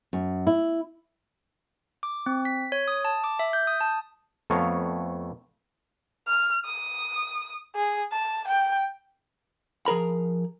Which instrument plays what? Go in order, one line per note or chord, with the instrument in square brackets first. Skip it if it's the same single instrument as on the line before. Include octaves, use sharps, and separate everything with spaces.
[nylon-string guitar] F#2
E4
[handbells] D6
C4
B6
C#5
D#6
A5
D6
E5
G6
D#6
A5
[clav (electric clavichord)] F2 A3 B3 C#5 F5 A#5
[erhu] F6
D#6
G#4
A5
G5
[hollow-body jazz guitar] F3 G#4 A#4 B5